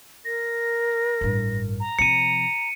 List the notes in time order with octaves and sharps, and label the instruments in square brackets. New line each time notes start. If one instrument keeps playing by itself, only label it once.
[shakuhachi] A#4 [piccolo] A#6
[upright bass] A1 G2
[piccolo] A#5
[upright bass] C3 F3 [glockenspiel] C#7 D#7